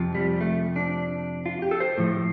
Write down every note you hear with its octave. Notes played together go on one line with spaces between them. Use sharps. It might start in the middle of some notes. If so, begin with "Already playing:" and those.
Already playing: F2 C3 F3
G3
A3
D4
F4
G4
A4
C5
A2 F3